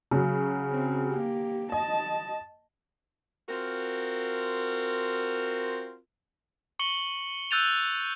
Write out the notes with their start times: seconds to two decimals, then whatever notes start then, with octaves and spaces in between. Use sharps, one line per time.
0.11 C#3 F#3
0.71 C4
1.08 A#3 G4
1.72 D#5 A5
3.49 C4 F4 F#4 A#4
6.79 C#6 C#7 F#7 G7
7.51 E6 F#6 G6 A6 D#7 F7